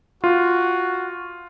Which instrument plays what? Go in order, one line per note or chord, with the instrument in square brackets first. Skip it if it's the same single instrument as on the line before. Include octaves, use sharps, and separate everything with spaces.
[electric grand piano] F4 [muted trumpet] F#4